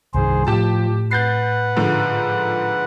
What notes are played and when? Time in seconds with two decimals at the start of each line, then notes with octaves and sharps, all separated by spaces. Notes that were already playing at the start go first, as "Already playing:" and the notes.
0.14 C2 G2 D#3 G#4 C5
0.47 A2 F3 G4 A5
1.11 B4 F#5 G6 A6 C7
1.76 G#2 D3 F3